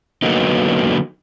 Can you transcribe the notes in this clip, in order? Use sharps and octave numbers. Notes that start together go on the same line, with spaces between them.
D3 F#3 A#3 B3 D#4